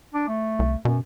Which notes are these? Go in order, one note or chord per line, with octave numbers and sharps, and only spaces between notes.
D4
A3
C2
F#2 B2